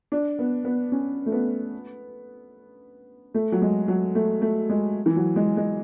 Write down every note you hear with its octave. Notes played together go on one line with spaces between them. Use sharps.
D4
B3
B3
C#4
A3
B3
A3
F#3
G#3
F#3
A3
A3
G#3
E3
F#3
G#3
G#3